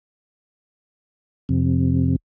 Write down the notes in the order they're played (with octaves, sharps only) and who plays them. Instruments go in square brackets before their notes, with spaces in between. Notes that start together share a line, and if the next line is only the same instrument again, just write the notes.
[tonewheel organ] F2 C3